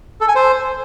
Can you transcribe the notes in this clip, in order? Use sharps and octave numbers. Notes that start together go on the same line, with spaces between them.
A4
G#5
C5